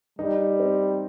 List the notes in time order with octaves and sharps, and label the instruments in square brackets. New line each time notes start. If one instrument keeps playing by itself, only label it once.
[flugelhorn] G3 [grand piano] D#4
[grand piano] C4